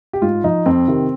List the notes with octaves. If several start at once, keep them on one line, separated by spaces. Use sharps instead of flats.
G4
G#2 F4
F3 D#4
F2 C4
C3 D#3